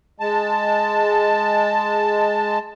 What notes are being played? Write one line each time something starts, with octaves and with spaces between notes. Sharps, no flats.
G#3 A5